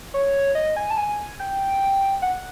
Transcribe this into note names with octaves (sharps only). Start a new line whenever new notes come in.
C#5
D#5
G#5
A5
G#5
G5
F#5